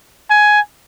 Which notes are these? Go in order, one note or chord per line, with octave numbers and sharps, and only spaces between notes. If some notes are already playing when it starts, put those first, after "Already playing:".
G#5